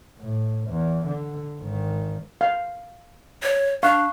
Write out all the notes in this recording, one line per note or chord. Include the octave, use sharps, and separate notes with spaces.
A2
E2
D3
G#1 D#3
F5
C#5
D4 F5 C#6 F#6